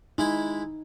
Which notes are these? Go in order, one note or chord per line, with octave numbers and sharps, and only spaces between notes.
G#3 D#4 E4 B5